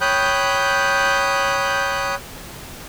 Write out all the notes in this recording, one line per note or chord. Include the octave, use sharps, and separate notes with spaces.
C#5 G5 B5 D#6 F#6 G6